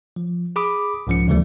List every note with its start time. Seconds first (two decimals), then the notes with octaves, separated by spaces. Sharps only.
0.16 F3
0.56 G#4 B5 D6 D#6
1.07 C2 G#2 F3 C#4 C#7
1.28 D2 C#3 E3 F3 G3 A3